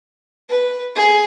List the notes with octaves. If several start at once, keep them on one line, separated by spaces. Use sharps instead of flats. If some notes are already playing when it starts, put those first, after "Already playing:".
B4
G#4